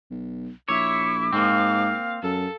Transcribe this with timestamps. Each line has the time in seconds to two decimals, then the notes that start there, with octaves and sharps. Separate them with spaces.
0.11 B1
0.69 A#1 E4 C#5 E5 D6
1.33 G#2 A#3 C4 F5
2.23 F#2 A4